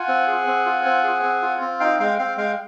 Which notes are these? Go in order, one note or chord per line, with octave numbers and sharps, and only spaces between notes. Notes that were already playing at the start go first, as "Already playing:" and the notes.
Already playing: F4 F#5 G#5
C4
G#4
C4
F4
C4
G#4
C4
F4
C4
D#4 F5 G5
G#3 F5 G5
C4 F5 G5
G#3 F5 G5